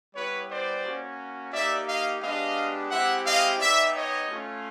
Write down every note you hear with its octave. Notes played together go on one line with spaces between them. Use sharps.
G3 B3 E4 G4 B4 C#5
C5 D5
A#3 C#4 F#4
A#3 D#4 G4 D5 E5
D#5 F5
G#3 B3 D4 G4 D#5 F5
G#3 C4 E4 G4 E5 F#5
D#5 F5
B3 D#4 G4 D5 E5
C#5 D#5
A3 C#4 F4